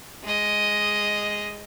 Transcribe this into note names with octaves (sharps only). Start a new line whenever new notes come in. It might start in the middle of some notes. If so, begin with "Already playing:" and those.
G#3 D#5